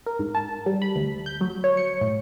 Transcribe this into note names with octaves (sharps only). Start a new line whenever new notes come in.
A#4
G#2
A5
G3
B5
D2
G6
F#3
C#5
C#7
A2